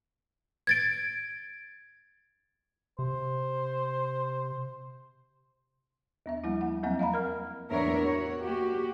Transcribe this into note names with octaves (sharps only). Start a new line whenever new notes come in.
G#6 A6 D7
C3 C5
D#2 B3 E5
F3 G3 A#3 E4
F#5
E2 F3 F#3 A#3 C4 F#5
D#5 F5 A#5 B5
E2 A#4 F6
E2 B3 D4 A#4 C#5 E5
F#4 C#5
A#3 F#4 G4